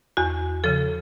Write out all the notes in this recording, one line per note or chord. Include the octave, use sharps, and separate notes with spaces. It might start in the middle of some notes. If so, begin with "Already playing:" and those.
E2 F#4
C#3 F3 A4